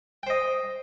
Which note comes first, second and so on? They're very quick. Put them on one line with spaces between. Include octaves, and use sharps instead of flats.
G5 C5 D#5